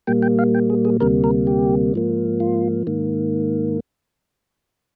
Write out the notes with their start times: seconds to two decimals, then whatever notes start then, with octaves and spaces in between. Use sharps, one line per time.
0.07 A#2 G3 A#3 G5
0.23 G5
0.39 F5
0.54 G5
0.70 G#4
0.85 G#4
1.00 D2 C3 G3 A#3 A#4
1.24 A#4
1.47 G4
1.94 G#2 F3 A#3
2.40 F4
2.87 G#2 D#3 A#3